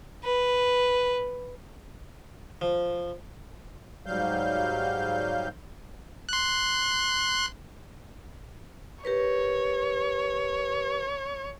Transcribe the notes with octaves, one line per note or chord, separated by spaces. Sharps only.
B4
F3
G#2 F#3 G3 F5 G6
C6 F#6
G4 A#4 B4 C#5